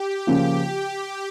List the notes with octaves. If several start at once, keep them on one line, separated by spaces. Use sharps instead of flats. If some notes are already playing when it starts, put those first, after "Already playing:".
Already playing: G4
C#3 F3 A#3 F4 G4